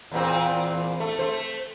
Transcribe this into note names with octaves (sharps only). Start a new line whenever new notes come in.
E2 A#2 C4
A3
A3 C5